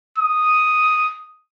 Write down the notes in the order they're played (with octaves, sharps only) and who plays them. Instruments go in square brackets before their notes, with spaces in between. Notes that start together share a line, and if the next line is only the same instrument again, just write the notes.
[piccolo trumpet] D#6